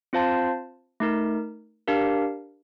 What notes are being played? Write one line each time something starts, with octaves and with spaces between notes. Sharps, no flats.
C4 F4 C5 F5 A5
A3 D#4 A#4
D4 G4 A#4 F5